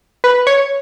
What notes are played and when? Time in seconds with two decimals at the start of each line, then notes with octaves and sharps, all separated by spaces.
0.24 B4
0.47 C#5